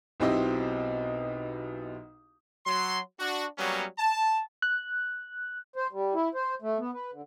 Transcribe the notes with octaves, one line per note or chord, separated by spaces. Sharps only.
B1 B2 C4 E4 G4 D#5
F#3 C6
D4 F#4
F#3 G3 A#3 B3 C#4
A5
F#6
C5
G3
E4
C5
A3
B3
B4
D3